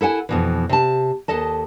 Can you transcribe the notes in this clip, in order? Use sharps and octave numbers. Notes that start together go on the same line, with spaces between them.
E4 A4 F#5 G#5
F2 B2 E3
C3 A5
D#2 A4 D#5 A5